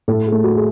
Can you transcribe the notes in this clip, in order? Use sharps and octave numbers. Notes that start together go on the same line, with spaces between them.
A2 A4
G#4
A3
F#4
G#4